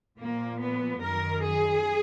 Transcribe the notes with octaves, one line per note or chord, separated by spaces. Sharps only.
A#2 F3 A#3
B3
F#2 D#3 A#4
G#4